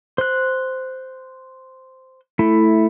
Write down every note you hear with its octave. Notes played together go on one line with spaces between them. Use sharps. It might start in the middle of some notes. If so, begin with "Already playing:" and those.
C5 F#6
A3 E4